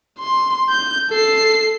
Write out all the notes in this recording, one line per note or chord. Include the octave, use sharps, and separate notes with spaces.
C6
G6
A4 C7